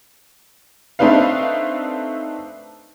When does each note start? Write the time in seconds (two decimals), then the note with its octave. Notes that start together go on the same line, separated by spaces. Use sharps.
0.99 A3 C4 D4 D#4 B4 F5